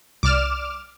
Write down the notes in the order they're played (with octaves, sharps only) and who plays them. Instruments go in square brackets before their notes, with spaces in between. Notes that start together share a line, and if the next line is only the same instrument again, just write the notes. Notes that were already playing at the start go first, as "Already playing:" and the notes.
[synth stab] C2 D5 E7 [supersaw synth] D6 F6